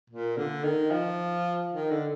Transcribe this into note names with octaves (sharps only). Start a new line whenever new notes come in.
A#2
D3
D#3
F3
D#3
D3